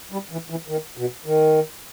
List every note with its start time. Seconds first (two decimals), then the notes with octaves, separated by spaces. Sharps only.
0.12 G3
0.31 E3
0.50 E3
0.68 D#3
0.97 B2
1.26 D#3